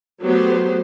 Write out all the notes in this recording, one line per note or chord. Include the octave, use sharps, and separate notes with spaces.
F#3 A3 B3 G4 C5